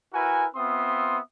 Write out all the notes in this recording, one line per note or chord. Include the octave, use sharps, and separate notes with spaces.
E4 F#4 A#4 B4 G#5
B3 C4 F4 E5 C6 D#6